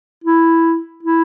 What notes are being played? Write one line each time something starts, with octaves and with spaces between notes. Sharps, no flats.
E4
E4